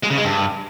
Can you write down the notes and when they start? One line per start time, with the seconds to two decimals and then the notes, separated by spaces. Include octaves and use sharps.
0.04 G#3
0.11 C#3
0.18 G#3
0.25 G2